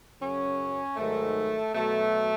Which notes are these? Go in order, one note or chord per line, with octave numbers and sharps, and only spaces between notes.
F#2 C#3 F#3 C#4
G#2 D#3 F#3 A3
B2 F#3 A3